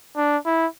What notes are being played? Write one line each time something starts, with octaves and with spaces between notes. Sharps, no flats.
D4
E4